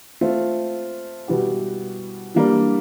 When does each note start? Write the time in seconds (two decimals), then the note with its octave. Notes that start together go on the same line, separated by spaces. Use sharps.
0.21 A3 C4 F4
1.28 B2 G3 B3 E4 G4
2.34 E3 G3 A#3 D4